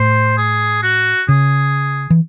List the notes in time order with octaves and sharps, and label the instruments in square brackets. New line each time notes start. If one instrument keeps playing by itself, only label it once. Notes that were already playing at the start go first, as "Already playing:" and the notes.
Already playing: [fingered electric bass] A2 [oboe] C5
[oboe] G#4
F#4
[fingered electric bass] C#3 [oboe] G#4
[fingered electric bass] E3